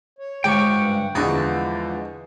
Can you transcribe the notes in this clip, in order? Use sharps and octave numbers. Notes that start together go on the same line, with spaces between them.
C#5
C#2 G#2 G4 G5 C#6
G2 F#5
E2 D3 E3 F3 G#3 F#4 D#5